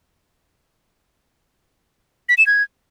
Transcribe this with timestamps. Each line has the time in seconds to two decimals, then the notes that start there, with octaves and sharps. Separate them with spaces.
2.29 B6
2.38 E7
2.47 G#6